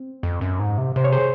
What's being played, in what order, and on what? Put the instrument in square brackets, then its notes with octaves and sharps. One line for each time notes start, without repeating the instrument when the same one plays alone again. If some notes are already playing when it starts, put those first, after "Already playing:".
Already playing: [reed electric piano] C4
[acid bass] F2
F#2
G#2
C3
[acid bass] C3 [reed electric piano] C5
[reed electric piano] C#5
G#4 C5